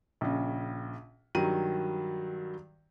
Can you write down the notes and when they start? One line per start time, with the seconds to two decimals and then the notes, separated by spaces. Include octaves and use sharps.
0.21 A#1 C#3
1.35 G2 D#3 F#3 A#5 D#7